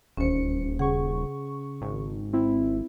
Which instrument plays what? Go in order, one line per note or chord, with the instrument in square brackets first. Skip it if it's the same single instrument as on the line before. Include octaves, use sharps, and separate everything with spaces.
[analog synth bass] D#1 [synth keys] D2 C#7 [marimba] C#4 C5
[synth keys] C#3 C#6 [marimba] G#4 F#5
[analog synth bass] G#1
[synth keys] C4 E4